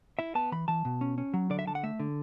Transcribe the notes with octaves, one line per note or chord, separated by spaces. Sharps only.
E4 E5
B3 A5
E3 B5
E3 A5
B2
C#4
C#4
F#3
D3 D5
E5
D3 A5
F#5
A3 E5
D3